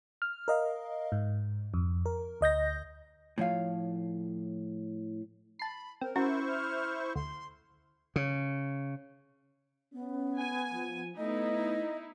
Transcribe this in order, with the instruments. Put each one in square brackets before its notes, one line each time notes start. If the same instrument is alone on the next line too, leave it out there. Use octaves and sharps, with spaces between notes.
[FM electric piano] F6
A#4 D#5 F5
G#2
F2
A#4
D2 D#5 G6 A#6
[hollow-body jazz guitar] A2 F3 C#5 F5
[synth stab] A5 C7 [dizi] B5
[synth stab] C4 [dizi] A#4
[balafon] C#4 [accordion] E4 C5 C#6 [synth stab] F#4
[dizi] F6
[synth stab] D2 [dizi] C6
[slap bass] C#3
[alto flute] B3 [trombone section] C#4
[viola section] G#5
[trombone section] F3
[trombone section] A3 B3 [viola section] D#4 E4 [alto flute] D#5